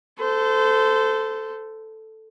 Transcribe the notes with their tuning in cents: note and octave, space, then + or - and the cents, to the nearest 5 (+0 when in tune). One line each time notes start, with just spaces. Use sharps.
A4 +0 C5 -25